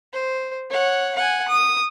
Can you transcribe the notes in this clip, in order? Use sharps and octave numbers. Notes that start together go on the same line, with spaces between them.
C5
C#5 F#5
F#5 G#5
D#6